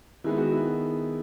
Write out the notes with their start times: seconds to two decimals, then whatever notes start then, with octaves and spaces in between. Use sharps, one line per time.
0.24 D#3 G#3 B3 E4
0.38 F#4
0.52 E4